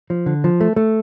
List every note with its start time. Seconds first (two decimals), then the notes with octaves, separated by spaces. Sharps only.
0.10 F3
0.26 D3
0.44 F3
0.61 A3
0.76 A3